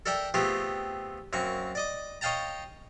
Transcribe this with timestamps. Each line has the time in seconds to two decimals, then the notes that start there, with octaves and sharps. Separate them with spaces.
0.06 A4 A#4 D5 E5 G5
0.34 A3 B3 C4 F4 G4 G#4
1.33 F#2 A#3 C4 C#6
1.75 D5 D#5 D6
2.21 C#5 D#5 F5 G5 A5 A#5